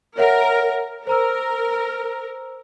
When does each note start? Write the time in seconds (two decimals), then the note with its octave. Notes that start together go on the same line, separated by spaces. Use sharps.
0.18 A#4 C#5 E5 F#5
1.07 A#4 C5 A#5 E6